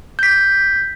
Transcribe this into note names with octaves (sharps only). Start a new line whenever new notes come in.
G6 B6